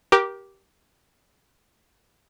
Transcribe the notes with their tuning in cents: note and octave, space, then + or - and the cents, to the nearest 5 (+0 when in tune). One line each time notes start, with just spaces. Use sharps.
G4 -10 A#4 +25 D6 +5